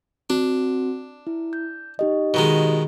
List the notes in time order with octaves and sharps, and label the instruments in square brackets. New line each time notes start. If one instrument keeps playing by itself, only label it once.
[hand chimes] C4 F#4 [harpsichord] D4
[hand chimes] E4
G6
D#4 G4 D#5
[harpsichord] B2 D#3 G#3